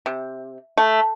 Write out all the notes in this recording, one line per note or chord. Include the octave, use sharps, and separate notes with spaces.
C3
A3